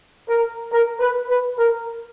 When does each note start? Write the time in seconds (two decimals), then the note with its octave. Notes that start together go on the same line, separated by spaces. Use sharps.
0.29 A#4
0.72 A#4
1.00 B4
1.29 B4
1.58 A#4